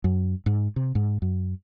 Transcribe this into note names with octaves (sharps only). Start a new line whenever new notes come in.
F#2
G#2
C3
G#2
F#2